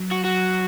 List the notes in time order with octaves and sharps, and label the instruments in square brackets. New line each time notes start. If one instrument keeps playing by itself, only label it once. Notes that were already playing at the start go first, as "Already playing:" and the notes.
Already playing: [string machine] F#3
[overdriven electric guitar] F#4
F#4